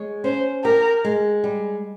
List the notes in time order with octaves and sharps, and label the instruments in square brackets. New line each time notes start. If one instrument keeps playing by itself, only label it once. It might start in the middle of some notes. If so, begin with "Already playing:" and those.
Already playing: [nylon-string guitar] G#3 C#5
[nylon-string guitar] C#4 [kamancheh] C5
[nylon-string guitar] G4 [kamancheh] A#4
[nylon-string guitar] G#3
G3